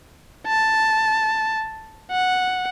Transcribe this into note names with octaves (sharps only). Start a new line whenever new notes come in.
A5
F#5